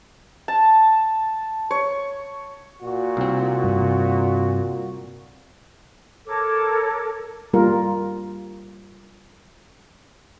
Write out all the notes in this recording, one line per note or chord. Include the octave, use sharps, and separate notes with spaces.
A5
C#5
A#2 F#4
C2 C4
G2 C3
A4 A#4 C#5 D6
G3 A#3 F4 A#4